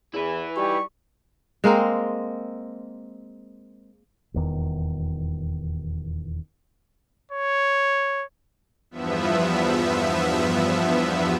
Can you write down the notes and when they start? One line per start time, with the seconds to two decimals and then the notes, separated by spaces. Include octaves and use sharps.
0.14 E2 E4 B4
0.57 G3 D#4 F#4 G4 C#6
1.64 G#3 A#3 C4 A#4
4.34 D#1 E2 D#3
7.32 C#5
8.91 E2 G2 F3 B3 E5